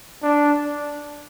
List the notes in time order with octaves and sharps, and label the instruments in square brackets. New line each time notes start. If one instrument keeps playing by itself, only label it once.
[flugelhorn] D4